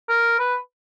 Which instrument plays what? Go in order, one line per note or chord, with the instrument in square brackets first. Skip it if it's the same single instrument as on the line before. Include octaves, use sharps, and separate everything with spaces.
[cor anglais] A#4
B4